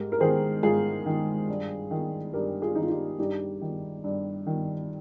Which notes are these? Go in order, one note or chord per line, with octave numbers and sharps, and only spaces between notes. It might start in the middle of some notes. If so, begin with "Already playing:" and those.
Already playing: G#2 G4 A#4
A#4
D#3 G#4 C5
G#2 F4 G#4
D#3
G2
D#3
G2 G4 A#4
F4 G#4
D#3 D#4
F4
D#4 G4
G2 D#4 G4
D#3
G2
D#3